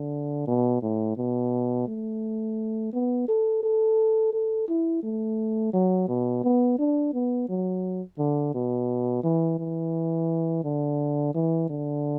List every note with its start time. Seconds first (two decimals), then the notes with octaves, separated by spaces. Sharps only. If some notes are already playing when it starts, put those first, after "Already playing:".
Already playing: D3
0.47 B2
0.82 A2
1.17 B2
1.87 A3
2.93 B3
3.28 A4
3.63 A4
4.33 A4
4.68 E4
5.03 A3
5.73 F#3
6.08 B2
6.44 B3
6.79 D4
7.13 B3
7.49 F#3
8.18 D3
8.54 B2
9.23 E3
9.59 E3
10.64 D3
11.35 E3
11.70 D3